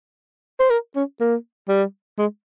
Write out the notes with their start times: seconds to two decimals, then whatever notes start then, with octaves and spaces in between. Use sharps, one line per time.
0.60 C5
0.70 A#4
0.96 C#4
1.20 A#3
1.68 G3
2.18 G#3